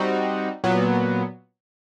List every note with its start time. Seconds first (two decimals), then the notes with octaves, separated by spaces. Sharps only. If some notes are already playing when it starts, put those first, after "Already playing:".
Already playing: G3 C4 D#4 F#4
0.64 A#2 F#3 B3